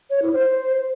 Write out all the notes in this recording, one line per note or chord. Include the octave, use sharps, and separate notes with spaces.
C#5
E4
C5